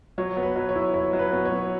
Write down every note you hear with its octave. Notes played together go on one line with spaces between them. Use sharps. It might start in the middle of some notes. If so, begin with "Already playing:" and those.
F#3 C#5
B3
B4
F#3
C#5
E4
E4 C#5
F#3
B4
B3
C#5
F#3